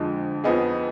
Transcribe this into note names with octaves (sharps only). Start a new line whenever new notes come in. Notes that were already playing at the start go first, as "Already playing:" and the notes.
Already playing: F2 D3 F3 G#3
F2 F3 B3 D#4 G#4